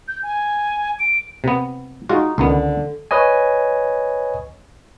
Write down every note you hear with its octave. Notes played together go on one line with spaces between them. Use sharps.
G6
G#5
D7
C3 B3
G#3 D#4 F4 F#4
C#2 D3 D#3 B3
B4 C#5 D#5 G#5